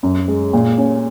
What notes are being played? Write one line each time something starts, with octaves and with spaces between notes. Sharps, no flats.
F#2
G#3
A#2
C#4